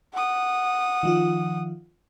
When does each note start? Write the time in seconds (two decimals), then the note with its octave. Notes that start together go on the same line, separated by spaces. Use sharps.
0.13 F#5 D#6
1.03 D#3 F3 F4